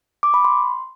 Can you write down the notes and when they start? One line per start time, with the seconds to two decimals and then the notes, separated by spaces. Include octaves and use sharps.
0.23 D6
0.34 B5
0.45 C6